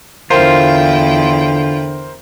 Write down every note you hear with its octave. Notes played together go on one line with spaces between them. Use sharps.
E2 D3 E4 F4 A#4 C5 G5